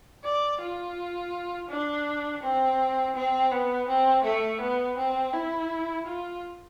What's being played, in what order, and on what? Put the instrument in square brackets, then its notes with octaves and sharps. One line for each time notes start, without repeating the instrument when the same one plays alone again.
[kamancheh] D5
F4
D4
C4
C4
B3
C4
A3
B3
C4
E4
F4